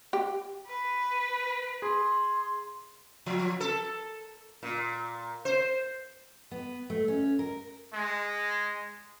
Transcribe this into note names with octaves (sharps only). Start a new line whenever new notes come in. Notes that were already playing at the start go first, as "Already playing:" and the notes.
G4
B4
G#4 C6
F3
A4
A#2
C5
B3
A3
C#4
A#4
G#3